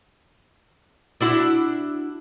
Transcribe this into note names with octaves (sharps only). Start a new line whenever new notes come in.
D4 E4 F#4